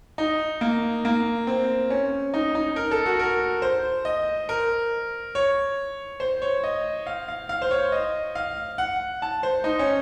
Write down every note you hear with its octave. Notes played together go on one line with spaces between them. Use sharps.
D#4
A#3
A#3
C4
C#4
D#4
D#4
A#4
A4
F#4
A#4
C5
D#5
A#4
C#5
C5
C#5
D#5
F5
F5
F5
C5
C#5
D#5
F5
F#5
A5
C5
D#4
C#4